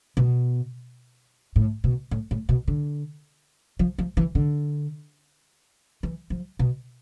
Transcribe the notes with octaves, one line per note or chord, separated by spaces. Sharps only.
B2
A2
B2
A2
A2
B2
D3
F3
F3
E3
D3
E3
F3
B2